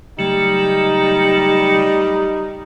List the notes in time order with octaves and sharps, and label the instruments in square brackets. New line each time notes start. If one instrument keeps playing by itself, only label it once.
[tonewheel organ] C#3 F#3 A3 [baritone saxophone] G3 [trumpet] D#4